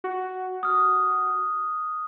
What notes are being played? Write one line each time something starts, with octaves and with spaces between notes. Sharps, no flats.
F#4
D#6 F6